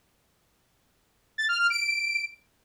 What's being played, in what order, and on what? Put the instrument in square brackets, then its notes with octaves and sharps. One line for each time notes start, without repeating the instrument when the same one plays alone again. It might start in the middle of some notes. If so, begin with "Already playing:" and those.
[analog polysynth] A6
F6
F6
D7